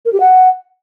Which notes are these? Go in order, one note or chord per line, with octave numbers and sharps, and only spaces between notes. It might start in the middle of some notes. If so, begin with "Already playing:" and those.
A#4
G4
F#5